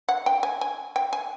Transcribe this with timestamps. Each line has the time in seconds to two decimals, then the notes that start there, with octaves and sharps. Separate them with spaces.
0.09 F#5
0.26 G5
0.43 G#5
0.61 G#5
0.96 G5
1.13 G#5